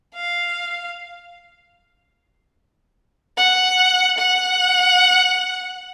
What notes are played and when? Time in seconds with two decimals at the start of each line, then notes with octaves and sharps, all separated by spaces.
0.15 F5
3.37 F#5
4.18 F#5